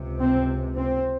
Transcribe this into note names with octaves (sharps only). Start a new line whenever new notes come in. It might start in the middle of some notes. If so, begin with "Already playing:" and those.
Already playing: C#2 C3
C4
C4